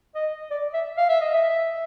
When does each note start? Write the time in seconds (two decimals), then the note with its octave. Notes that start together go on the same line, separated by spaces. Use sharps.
0.15 D#5
0.51 D5
0.74 E5
0.97 F5
1.09 E5
1.21 D#5
1.34 E5